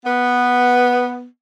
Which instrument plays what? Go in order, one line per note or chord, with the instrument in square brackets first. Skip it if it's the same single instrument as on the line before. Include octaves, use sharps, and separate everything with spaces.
[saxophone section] B3